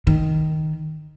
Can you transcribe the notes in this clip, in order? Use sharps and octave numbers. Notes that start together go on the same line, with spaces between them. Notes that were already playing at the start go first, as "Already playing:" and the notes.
D#3